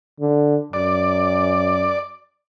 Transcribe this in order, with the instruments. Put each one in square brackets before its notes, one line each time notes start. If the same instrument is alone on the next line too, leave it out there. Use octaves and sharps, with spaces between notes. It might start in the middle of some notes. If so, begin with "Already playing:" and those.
[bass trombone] D3
[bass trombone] F#2 [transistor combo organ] D5